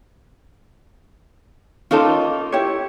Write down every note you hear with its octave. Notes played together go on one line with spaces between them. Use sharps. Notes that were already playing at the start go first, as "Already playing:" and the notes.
A#3 C#4 D#4 F4 A4 A5
E4 G4 C#5